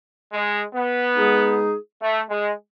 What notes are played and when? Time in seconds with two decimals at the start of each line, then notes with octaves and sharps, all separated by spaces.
0.32 G#3
0.75 B3
1.17 G#3 D#4 G#4
2.01 A3
2.29 G#3